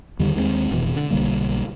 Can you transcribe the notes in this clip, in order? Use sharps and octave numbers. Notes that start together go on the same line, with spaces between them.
E2 D3 D#3 G3
D#2 G#3 A#3 C4
F1 B2 E3
D3
B1 D3 G3 A#3